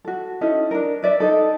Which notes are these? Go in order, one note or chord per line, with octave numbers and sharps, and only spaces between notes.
F#4 A4
C#4 D#4 E4 A4
D4 A#4
B4 D5 E5
D#4 A4